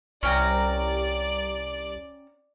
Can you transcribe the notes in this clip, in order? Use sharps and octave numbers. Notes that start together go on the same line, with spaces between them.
C2 C#4 D5 G5 A#5